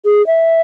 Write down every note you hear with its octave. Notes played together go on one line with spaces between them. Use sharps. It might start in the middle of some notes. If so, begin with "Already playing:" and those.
G#4
E5